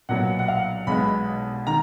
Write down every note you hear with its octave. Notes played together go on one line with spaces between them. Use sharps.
B1 A#2 F#3 B3 F#5
F#5
F5
B1 B2 G#3 B3 B5
D#3 A#5